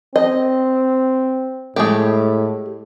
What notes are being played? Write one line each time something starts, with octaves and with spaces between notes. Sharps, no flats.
C4 D#5
A2 G#3 A3 G4